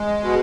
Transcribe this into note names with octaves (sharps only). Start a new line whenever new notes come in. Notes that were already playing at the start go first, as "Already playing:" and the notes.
Already playing: G#3
B2